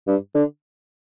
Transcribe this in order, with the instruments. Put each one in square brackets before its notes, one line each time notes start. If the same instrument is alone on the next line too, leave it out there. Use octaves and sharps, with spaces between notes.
[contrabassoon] G2
D3